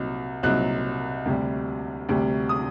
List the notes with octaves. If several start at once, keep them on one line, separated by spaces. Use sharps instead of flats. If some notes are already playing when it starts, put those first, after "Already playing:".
Already playing: C2 A#2 F#3 C4 D#4
C2 A#2 F#3 C4 D#4 F#6
D2 C3 G3
D2 C3 G3
D#6